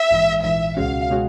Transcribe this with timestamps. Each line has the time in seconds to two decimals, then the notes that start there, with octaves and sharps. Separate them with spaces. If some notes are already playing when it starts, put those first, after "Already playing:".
Already playing: E5
0.11 A#1 G#2 E3
0.43 A#1 G#2 E3 E5
0.77 C#2 B2 G#3 C#4 F#4 F5
1.10 B2 G#3 C#4 F#4